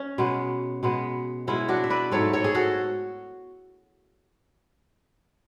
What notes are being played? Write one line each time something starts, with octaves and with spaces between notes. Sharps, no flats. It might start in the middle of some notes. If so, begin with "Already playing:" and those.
Already playing: C#4
B2 G#3 B3
B2 G#3 B3
B2 G#3 B3 C#4 E4
D4 F#4
E5
B4 D5
G#2 F#3 A3 A4 C#5
A4 C#5
G#4
F#4 A4